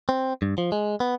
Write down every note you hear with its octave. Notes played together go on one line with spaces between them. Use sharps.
C4
G2
F3
G#3
B3